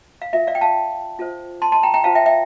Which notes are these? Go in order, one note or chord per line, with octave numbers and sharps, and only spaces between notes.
F5
F4 A#4 E5
D5 F5
G5
F5 A5
F4 A4 C5
A5 C6
A5 C6
G5 A#5
G5 A#5
F4 C5 F5 A5
E5 G5
E5 G5